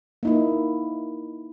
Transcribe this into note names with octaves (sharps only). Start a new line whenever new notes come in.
A#3 D#4 E4